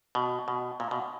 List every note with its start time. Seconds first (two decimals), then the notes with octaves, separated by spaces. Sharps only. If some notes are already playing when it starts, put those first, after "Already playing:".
0.15 B2
0.48 B2
0.80 A#2
0.91 B2